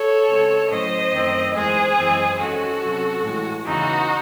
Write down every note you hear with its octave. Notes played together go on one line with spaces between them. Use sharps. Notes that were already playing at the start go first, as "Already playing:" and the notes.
Already playing: A4 C#5
C#3 G#3 C4
A2 F#3 A3 C#4 C5 D#5
F#2 D#3 A3 C4
E2 D#3 G#3 G#4 C5
F#2 E3 G#3 C4
E2 D#3 G#3 C#4 F#4 A4
C3 F#3 C#4
A2 E3 G#3
E2 C#3 E3 D#4 F#4